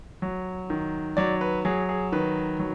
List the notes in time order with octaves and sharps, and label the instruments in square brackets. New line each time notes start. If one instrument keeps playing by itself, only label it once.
[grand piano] F#3
D#3
F#3 D5
B4
F#3 G#4
G#4
D#3 B4
F#3